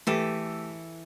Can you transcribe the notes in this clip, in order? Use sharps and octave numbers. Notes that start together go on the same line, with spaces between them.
E3 A3 G4 A4 E6